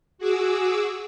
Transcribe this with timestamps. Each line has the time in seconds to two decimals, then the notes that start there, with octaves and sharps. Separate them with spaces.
0.18 F#4 G#4 D6 E6